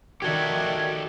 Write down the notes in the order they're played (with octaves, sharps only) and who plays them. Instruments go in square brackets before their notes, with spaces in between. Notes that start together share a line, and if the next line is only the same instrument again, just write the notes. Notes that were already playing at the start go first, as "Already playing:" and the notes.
[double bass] D#3 [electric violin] F#4 D5 [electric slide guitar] G4 A4 E5 [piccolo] G#6